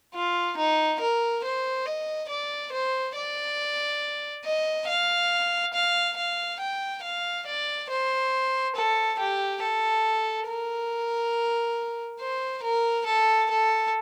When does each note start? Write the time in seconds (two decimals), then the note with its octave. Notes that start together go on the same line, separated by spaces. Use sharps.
0.14 F4
0.57 D#4
1.00 A#4
1.43 C5
1.86 D#5
2.29 D5
2.72 C5
3.15 D5
4.45 D#5
4.87 F5
5.73 F5
6.17 F5
6.60 G5
7.03 F5
7.46 D5
7.90 C5
8.76 A4
9.18 G4
9.62 A4
10.47 A#4
12.20 C5
12.63 A#4
13.06 A4
13.50 A4